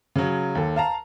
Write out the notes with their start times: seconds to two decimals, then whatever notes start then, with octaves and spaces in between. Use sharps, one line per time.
0.16 C#3 F#3
0.55 D#2 A4
0.76 F5 A5 A#5